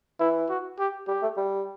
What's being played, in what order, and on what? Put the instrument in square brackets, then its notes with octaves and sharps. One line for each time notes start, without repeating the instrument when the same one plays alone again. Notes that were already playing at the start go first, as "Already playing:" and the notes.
[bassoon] E3 [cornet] E4
[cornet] F#4
G4
[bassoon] G3 [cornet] G4
[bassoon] A3
G3